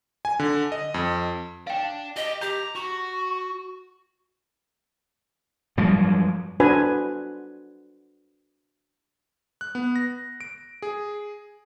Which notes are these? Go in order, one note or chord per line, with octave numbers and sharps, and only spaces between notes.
G#5
D3
D#5
F2
D5 F5 G5 A5
G4 D#5
G4 A#5 G6
F#4 C#6
G2 F3 F#3 G#3
D4 F#4 B4 C5 G#5
F#6
B3
A#6
D7
G#4